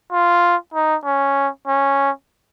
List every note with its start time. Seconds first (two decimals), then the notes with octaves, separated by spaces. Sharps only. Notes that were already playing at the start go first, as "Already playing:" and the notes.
0.12 F4
0.74 D#4
1.05 C#4
1.67 C#4